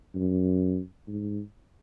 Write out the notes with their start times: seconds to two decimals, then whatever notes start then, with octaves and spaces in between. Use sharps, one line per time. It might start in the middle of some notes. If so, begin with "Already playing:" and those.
0.15 F#2
1.08 G#2